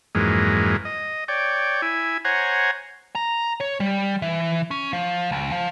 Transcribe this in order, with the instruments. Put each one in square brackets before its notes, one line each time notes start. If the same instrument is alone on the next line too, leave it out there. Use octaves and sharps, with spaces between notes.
[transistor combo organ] F2 G#2 E3 F#3 G#3 A#3
D#5
C#5 D5 G5
E4 G#5
C5 C#5 F#5 G#5 A#5
[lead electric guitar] A#5
C#5
G3
E3
C#4
F3
C#2
F3